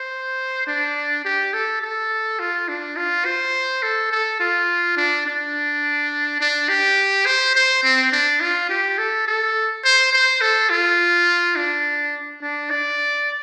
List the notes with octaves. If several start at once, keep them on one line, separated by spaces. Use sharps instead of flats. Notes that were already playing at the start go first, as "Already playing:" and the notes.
Already playing: C5
D4
G4
A4
A4
F4
D4
F4
C5
A4
A4
F4
D4
D4
D4
G4
C5
C5
C4
D4
F4
G4
A4
A4
C5
C5
A4
F4
D4
D4
D5